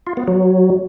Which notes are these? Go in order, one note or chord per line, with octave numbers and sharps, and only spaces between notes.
F4
B3
F#3